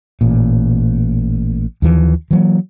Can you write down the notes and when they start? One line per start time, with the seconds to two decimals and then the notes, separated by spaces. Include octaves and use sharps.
0.21 A1 A#2
1.82 D#2 E3 F3
2.31 E3 F#3 A#3